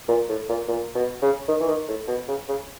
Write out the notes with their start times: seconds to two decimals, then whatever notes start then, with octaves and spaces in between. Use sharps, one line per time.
0.09 A#2
0.29 A2
0.49 A#2
0.68 A#2
0.95 B2
1.22 C#3
1.48 D#3
1.60 E3
1.68 D#3
1.89 A2
2.08 B2
2.28 C#3
2.48 C#3